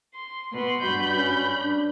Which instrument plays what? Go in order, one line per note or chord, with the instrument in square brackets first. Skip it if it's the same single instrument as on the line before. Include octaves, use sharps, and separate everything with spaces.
[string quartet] C6
B2 B4 C6
[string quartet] G2 B5 G6 [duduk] F#4
[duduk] C#4
D4